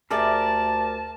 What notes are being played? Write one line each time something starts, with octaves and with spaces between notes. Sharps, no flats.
D2 G4 G#4 A#4 D5 E5 A5